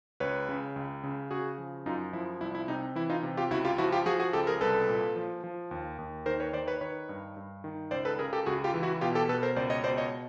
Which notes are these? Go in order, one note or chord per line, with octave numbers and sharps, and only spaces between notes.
C#2 B4 C#5
C#3
C#2
C#3
C#3 F#4 G#4
F3
F#2 D#4 F4
F3 E4
C2 E4
E4
C3 D#4
E3 E4
D#4 F4
C3
F4 G4
C#2 E4 F#4
F4 G4
F3 E4 F#4
F4 G4
F3 F#4 G#4
F#4 G#4
C#2 G4 A4
G#4 A#4
C2 A4 B4
A#2
F3
F3
D#2
D#2
D#3 A#4 C5
B4 C#5
D#3 C5 D5
B4 C#5
D#3 B4 C#5
G2
G2
D#3
C#2 C5 D5
A4 B4
C#3 G#4 A#4
G4 A4
C#2 F#4 G#4
F4 G4
E3
E4 F#4
B2 F4 G4
G4 A4
B2 A4 B4
A#4 C5
C#2 C5 D5
C#5 D#5
B2 C5 D5
C#5 D#5